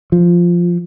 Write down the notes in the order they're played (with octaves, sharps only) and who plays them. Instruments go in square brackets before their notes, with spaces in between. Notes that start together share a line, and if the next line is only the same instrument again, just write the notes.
[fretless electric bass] F3